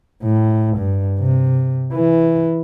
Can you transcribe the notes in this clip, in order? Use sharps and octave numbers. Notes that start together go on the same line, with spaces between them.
A2
G2
C3
E3